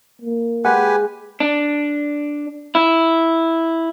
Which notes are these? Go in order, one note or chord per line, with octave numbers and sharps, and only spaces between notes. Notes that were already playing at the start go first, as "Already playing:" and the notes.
A#3
G#3 G4 B4 F#5 G#5
D4
E4